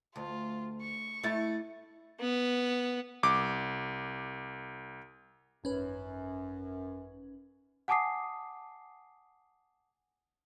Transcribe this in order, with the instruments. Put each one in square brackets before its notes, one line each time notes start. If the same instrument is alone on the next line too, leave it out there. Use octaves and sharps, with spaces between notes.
[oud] D2 [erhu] F4
[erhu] C#6
[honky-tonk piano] A3 A6 [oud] E4
[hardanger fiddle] B3
[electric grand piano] C2 D6
[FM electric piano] G#1 C#4 B4 [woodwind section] F#2
[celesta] F#5 G#5 A5 D6 D#6 C7